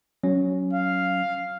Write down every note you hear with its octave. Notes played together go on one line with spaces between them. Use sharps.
F#3 C#4
F5